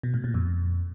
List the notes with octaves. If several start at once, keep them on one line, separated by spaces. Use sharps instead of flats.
B2
A2
A#2
F2